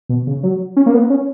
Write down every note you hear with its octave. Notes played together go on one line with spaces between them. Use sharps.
B2
C#3
F#3
C#4
A#3
B3
C#4